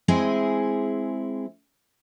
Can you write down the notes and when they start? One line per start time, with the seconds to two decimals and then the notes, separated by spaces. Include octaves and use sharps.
0.08 G#3 C4 E4 G#4